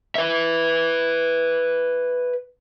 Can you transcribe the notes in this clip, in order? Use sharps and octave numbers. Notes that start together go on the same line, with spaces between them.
B4 E5